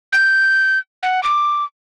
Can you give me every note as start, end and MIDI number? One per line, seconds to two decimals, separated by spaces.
0.13 0.78 91
1.03 1.23 78
1.23 1.64 86